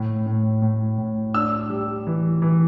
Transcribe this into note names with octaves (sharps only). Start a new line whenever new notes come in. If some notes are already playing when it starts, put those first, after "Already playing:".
Already playing: A2
A2
A2
A2
D4 E6
G3
E3
E3